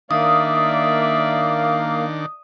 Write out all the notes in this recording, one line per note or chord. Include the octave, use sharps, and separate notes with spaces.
D#3 A#3 D4 D5 E5 F5 D#6